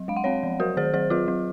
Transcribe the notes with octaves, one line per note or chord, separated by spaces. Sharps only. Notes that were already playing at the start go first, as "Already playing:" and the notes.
Already playing: F#3
G#3 F5
F#5
C4 C#5 F5
F3
F#3 F#4 A#4
D#3 G#4 C5
F#3 G#4 C5
F#3 F4 G#4
F#3